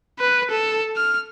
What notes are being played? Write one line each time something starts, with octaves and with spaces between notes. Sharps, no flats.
B4
A4
F6